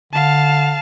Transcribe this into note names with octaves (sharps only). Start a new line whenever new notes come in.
D3 F5 A5